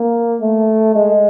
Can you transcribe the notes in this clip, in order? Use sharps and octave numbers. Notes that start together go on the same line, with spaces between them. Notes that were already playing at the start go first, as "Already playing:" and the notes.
Already playing: A#3
A3
G#3